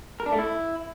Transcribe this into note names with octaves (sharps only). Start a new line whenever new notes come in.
A#4
D4
A3
E4